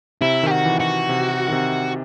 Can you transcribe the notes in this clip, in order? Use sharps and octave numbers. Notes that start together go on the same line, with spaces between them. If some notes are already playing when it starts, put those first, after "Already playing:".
C3 E4
D#3 G4
F#4
E3
F#4
C3
D#3
C3